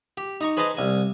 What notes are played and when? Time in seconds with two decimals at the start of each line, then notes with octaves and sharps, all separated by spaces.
0.17 G4
0.41 D#4 A#5 C#6
0.57 G#4 B4 C5 D#5 A5 A#5
0.77 C2 G#5